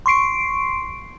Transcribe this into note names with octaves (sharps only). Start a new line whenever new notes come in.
C6 C#6 C7 D7